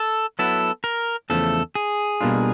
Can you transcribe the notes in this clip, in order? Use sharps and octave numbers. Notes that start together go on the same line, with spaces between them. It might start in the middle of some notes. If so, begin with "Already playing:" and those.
Already playing: A4
F#3 B3 E4 A4
A#4
E2 C#3 F3 A3 A4
G#4
B2 G3 A#3 D4 F4